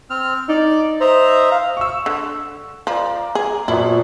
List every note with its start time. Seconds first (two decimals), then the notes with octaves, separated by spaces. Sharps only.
0.10 C4 F6
0.49 D#4 D5
1.01 C5 D#5 E5 A#5
1.51 F5
1.77 C#6 E6
2.06 D3
2.87 F3 A#4 D5
3.35 G#4
3.68 F#2 A#2 F3 B3 E4 D5